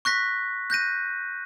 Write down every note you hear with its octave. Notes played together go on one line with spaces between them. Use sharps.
C#6 F#6 A#6 B6
F#6 G6 A#6 D#7